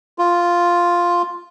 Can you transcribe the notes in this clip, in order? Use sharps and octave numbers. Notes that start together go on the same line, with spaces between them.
F4